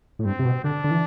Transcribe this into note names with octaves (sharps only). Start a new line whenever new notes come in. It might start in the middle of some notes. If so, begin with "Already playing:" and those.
A2
G2 C4
C3
B2
D3 D4
D3
E3